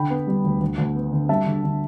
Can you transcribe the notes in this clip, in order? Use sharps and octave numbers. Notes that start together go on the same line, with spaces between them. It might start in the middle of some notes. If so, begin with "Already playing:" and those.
Already playing: D3 G5 B5
B3
G3
D2
D2
D2
B3
D3
G3 E5 A5
D3
D3